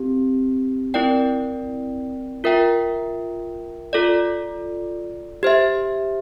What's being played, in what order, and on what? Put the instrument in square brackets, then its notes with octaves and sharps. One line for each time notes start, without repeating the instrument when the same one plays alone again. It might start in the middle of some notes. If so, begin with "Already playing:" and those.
Already playing: [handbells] C4 G4
C4 E4 A#4 D5 G5
F4 A#4 E5 G5
F4 A4 D5
G4 C5 E5